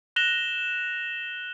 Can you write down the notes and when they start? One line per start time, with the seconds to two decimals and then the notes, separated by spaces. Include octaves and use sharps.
0.16 F#6 A#6 E7 F7 G7